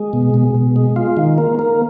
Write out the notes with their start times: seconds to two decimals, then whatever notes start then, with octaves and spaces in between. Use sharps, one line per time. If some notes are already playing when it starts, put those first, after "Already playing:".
Already playing: G#3
0.13 B2
0.34 B2
0.55 B2
0.76 G#3
0.96 F4
1.17 D#3
1.38 A#3
1.59 A#3